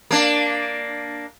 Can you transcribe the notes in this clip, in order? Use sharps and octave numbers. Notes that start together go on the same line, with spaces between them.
A#3 D4